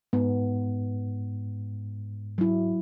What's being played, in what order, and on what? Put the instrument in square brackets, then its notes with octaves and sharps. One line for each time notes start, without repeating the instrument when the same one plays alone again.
[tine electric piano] G#2 [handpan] B3
[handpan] F#3 E4